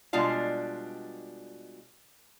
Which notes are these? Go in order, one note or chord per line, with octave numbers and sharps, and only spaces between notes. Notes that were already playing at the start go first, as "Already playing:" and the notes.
B2 G3 G#3 D4 F4 F5